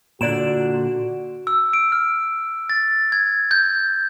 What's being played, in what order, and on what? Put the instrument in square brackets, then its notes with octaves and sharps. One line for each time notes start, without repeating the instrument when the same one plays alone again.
[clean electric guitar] A#2 D3 [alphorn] F#4 [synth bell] D5 D7 E7
[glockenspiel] E6
D7
F6
A6
G#6
G6